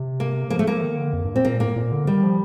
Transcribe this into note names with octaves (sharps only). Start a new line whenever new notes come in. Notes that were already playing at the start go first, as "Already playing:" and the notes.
Already playing: C3
A#3
F3 A#3
A3
F3 A#3
D#3
D3
F2
G2
A#2 C4
A#2 A#3
A2 A#3
A#2
D3
D#3 G3
F3